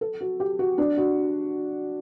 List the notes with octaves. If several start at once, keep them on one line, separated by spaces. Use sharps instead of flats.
A4
F#4
G4
F#4
D4
F#4